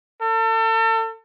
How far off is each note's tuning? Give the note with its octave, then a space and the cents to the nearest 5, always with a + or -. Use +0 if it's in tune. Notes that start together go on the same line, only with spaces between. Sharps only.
A4 +35